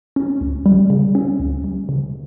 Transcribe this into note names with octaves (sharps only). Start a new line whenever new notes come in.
C#4
D2
G3
C#3
C#4
D2
G3
C#3